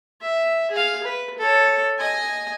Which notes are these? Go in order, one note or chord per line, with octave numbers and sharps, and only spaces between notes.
E5
G#4 F5
B4
A4 C#5
D#5 G#5